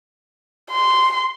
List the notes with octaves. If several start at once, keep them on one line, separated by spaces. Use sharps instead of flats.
C6